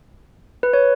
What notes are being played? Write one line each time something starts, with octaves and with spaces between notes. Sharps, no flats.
B4
C#5